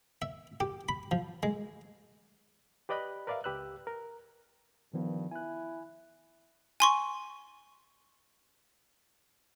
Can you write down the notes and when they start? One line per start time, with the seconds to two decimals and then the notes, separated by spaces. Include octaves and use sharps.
0.22 E5
0.60 G4
0.89 B5
1.11 F3
1.43 G#3
2.89 G4 B4 D5 D#5 B5 F#6
3.27 A#4 B4 D5 E5 F5
3.44 C#2 G4 B4 E6 F#6
3.87 A#4
4.94 G2 D#3 F3 B3
5.31 E4 G#5 F#6
6.80 G#5 C6 C#6